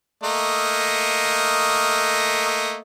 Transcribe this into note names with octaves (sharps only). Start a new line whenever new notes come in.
A3 A#3 D#5